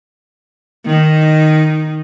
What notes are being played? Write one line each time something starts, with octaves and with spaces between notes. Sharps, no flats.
D#3 D#4